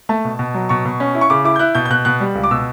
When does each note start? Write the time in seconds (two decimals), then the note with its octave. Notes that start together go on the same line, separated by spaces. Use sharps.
0.09 A3 A5
0.25 B2
0.39 B2
0.54 F#3
0.69 B2 C#6
0.85 B2
1.00 C#4
1.15 E4
1.21 C#6
1.30 C#3 D6
1.44 E4 D6
1.56 G6
1.59 E4 F#6
1.75 B2 G6
1.85 G6
1.90 B2 F#6
2.05 B2 F#6
2.20 G3
2.35 C#2
2.44 D6
2.51 B2 E6